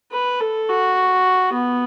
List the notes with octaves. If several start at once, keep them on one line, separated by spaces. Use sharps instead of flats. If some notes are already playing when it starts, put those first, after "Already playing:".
B4
A4
F#4
B3